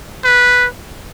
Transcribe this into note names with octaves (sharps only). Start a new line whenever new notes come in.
B4